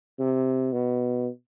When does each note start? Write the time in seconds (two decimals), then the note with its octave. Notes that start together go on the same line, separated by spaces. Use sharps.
0.19 C3
0.73 B2